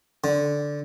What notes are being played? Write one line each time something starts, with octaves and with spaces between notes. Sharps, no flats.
D3